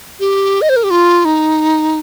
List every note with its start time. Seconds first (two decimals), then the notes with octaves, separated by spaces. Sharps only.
0.20 G4
0.61 D#5
0.69 C5
0.76 A#4
0.83 G4
0.90 F4
1.25 D#4